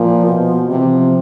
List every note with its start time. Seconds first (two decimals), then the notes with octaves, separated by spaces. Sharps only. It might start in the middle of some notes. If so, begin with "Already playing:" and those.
Already playing: A#2 F3
0.27 B2
0.69 C3 F3
0.78 E3
0.87 F3